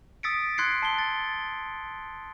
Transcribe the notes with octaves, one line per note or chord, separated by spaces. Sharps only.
D#6 E6 A6 B6 C#7 D7
C6 F#6 G#6 C7 C#7
A5 G7
A6